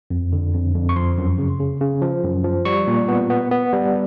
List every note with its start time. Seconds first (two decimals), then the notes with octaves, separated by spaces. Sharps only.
0.10 F2
0.33 D3
0.54 F2
0.75 F2
0.89 C#6
0.96 F3 C6
1.18 F#2
1.38 C#3
1.60 C#3
1.81 C#3
2.02 F3
2.24 F#2
2.44 F3
2.65 G3 C#6
2.87 A#2
3.08 B3
3.30 B3
3.51 B3
3.73 G3